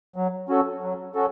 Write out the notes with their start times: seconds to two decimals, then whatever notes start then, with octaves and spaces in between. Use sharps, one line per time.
0.16 F#3
0.49 C#4 F#4 A4
0.82 F#3
1.15 C#4 F#4 A4